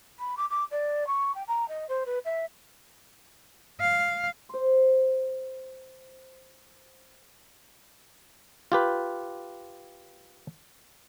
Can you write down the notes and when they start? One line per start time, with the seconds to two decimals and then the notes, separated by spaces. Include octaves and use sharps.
0.19 B5
0.37 D6
0.50 D6
0.70 D5
1.06 C#6
1.34 G5
1.47 A#5
1.68 D#5
1.88 C5
2.06 B4
2.25 E5
3.80 F5
4.49 C5 C6
8.72 F4 G4 B4